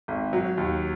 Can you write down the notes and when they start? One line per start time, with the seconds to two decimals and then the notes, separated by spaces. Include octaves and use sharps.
0.08 G#1
0.33 F#3
0.58 D#2